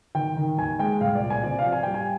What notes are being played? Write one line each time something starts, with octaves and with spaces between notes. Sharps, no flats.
D#3 G5
D#3
D#2 G#5
G#3 G5
C2 F5
D5
A#2
G#5
C3 D5
F5
F3
G#5
G3 G5
G#5